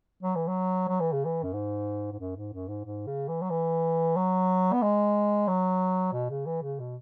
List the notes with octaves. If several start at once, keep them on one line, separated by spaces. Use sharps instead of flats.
F#3
E3
F#3
F#3
E3
C#3
E3
F#2
G#2
G#2
F#2
G#2
F#2
G#2
G#2
C#3
E3
F#3
E3
F#3
B3
G#3
F#3
B2
C#3
E3
C#3
B2